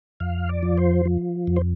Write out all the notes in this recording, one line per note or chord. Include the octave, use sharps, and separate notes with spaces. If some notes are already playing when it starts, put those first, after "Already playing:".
F2 F5
D5
F3
C5
F3
F2
C5